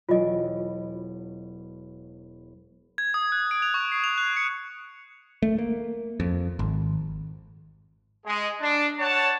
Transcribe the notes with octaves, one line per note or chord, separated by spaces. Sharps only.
E1 F#3 F4 D#5 D7
G#6
D#6
F#6
D7
F7
C#6
C7
F7
F#6
C#7
A3
A#3
F2
G#1
G#3 G#4
D4
C#5 F#5 A5